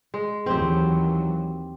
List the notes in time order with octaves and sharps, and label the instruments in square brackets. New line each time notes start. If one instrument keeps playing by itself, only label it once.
[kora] G#3
[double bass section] D#2 E3 F#3 [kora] C4 G4